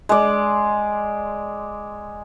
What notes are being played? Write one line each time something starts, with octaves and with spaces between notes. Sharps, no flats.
G#3 D5